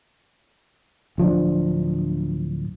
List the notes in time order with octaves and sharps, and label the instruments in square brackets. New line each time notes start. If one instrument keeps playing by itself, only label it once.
[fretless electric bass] D1 F3 C#4 D4